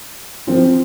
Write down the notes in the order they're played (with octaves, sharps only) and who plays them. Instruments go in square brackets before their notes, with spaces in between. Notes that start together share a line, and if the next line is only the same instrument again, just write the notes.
[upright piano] F3 C4 F4